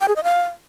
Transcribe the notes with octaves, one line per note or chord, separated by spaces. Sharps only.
G5
G#4
D#5
F5